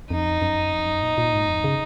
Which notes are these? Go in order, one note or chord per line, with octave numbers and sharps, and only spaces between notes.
F2 D#4
F#2
F2
F#2
A#2
A#2
G#2
F2
C#3